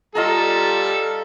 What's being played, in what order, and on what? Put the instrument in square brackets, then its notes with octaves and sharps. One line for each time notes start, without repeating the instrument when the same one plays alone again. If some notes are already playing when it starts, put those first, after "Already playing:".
[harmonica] G3 A4 [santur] F4 D#5 A#5